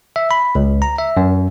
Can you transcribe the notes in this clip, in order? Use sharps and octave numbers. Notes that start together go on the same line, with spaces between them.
E5
B5
C#2
A#5
E5
F#2